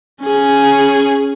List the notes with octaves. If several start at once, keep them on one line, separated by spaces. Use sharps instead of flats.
C#4 G#4